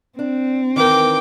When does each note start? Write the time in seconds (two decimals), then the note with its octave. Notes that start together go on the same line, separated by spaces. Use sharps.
0.19 C4 D4
0.76 D#3 E3 A#4 G5 D6